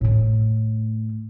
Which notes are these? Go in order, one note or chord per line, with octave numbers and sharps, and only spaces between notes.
A2 A3